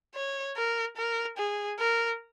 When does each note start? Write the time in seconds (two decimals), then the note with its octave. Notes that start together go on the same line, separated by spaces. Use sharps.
0.15 C#5
0.56 A#4
0.97 A#4
1.38 G#4
1.80 A#4